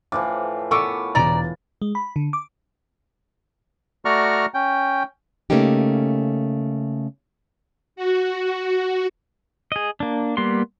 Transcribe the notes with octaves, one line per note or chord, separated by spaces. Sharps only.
A2 E3 F3 D6
B3 A4 A#4 C#6 D6
E1 C#3 D5 A#5 A6
G#3
B5
D3
D6
A3 F#4 D5 A#5 C#6 F6
C#4 G5
C#3 A3 A#3 C#4 D#4 G4
F#4
G#4 D#5
A#3 D4
G3 A#3 B3 C6